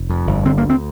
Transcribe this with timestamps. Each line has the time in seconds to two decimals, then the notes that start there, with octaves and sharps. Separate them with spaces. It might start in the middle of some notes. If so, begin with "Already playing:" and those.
Already playing: F1
0.09 F2
0.27 G1
0.45 D3 C4
0.58 A#3
0.64 D2
0.70 C4